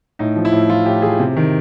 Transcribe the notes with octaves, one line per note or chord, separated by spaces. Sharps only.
A2 D#4
F3
E4
A2
F3 F4
A2 G4
F3 G#4
C3
D#3